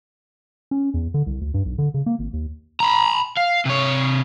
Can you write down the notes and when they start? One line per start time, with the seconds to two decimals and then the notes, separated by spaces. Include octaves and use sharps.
0.71 C#4
0.94 E2
1.14 D3
1.26 C2
1.41 D2
1.54 G2
1.65 B1
1.78 D3
1.94 C#3
2.06 A#3
2.19 G#1
2.33 D#2
2.80 A#5 B5
3.37 F5
3.66 C3 C#5